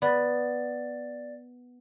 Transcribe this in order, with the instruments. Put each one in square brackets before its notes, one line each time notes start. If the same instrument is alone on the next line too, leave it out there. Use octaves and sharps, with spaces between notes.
[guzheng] B3 [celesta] D5 A6